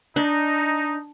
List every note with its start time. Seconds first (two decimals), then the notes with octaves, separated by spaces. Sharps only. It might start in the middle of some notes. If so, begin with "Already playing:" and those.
0.16 D4 D#4